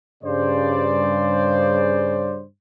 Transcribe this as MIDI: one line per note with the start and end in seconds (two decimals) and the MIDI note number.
0.24 2.43 43
0.24 2.43 49
0.24 2.43 72
0.24 2.43 74